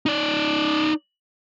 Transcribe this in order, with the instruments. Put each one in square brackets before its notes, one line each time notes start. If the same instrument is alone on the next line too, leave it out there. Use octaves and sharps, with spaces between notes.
[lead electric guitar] D#4 D5